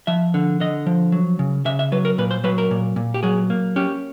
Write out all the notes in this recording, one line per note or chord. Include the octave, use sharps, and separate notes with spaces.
F3 E5
D3
D3 D#5
F3
F#3
C#3
C#3 E5
E5
F#3 B4
A#4
A#2 B4
C5
F#3 B4
A#4
A#2
A#2
G4
F#3 G#4
A#3
C#4 G4